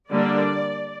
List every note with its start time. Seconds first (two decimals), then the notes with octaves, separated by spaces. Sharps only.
0.10 D3 G3 A#3 D4 D5